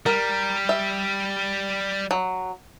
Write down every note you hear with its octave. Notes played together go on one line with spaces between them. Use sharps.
G3 A#4
E5
F#3